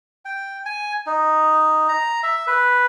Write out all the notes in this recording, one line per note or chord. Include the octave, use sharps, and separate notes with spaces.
G5
G#5
D#4
A#5
E5
B4